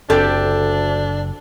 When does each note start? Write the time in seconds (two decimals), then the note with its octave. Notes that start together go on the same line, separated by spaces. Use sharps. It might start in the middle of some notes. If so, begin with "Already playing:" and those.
0.10 F#1 D2 C4 D4 G4 A4